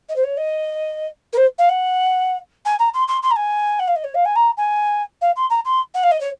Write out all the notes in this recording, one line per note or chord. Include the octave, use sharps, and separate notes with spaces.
D#5
C5
C#5
D#5
A#4
C5
F5
F#5
G#5
A#5
C6
C6
C6
A#5
G#5
F#5
F5
D#5
C#5
F5
G#5
A#5
G#5
F5
C6
A#5
C6
F#5
F5
D#5
C#5